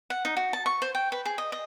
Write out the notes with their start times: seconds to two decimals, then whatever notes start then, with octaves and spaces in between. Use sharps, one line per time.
0.10 F#5
0.25 D#4
0.37 F#4
0.53 A5
0.66 C#6
0.82 C5
0.95 G5
1.12 B4
1.25 G#4
1.38 D#5
1.52 D#5